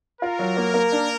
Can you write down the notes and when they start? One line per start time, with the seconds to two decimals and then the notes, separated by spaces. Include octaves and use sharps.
0.22 F4 A#4
0.39 F#3
0.57 A#3
0.74 A#3
0.92 D4